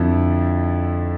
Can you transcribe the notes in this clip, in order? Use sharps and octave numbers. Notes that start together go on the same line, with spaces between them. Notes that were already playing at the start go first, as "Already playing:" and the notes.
Already playing: F2 D3 F3 E4